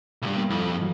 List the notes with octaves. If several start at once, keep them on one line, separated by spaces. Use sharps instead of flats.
B1 G2
A#3 B3
F2 E4
G2 E3 F#3